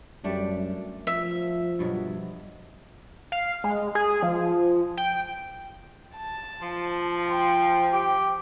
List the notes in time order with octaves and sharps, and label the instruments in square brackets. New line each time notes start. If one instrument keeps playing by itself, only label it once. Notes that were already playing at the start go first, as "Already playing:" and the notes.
[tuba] F#2 [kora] G3 A3 D4
[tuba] F3 [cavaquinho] E5
[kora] G2 B2 F#3
[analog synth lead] F5
G#3
G#4
F3
G5
[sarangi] A5
[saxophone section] F3
[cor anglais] C5 [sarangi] G5
[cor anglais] G4